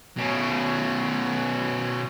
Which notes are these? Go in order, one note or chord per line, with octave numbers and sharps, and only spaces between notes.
B2 C#4